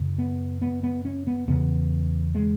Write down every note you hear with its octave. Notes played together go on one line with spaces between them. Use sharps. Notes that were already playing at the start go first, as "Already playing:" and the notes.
Already playing: F#2 C#3
B3
B3
B3
C#4
B3
E2 C#3 B3
G#3